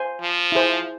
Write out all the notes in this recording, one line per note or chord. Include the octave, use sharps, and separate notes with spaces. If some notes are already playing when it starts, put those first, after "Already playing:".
Already playing: C5 F5 G#5 C6
F3
E4 G#4 C5